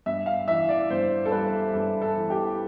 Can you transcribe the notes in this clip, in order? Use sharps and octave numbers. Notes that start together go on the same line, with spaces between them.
G2 E5
F5
E3 E5
D5
G2 C5
A4
G3 B4
G2 A4
A4
E3
G4